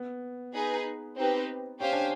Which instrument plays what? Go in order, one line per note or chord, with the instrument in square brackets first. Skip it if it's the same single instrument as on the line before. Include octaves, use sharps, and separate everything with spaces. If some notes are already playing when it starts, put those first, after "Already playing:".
Already playing: [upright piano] B3
[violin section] D#4 G#4 B4
C4 D#4 G4 B4
[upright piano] C#4 [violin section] G4 C5 F5 G#5
[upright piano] D4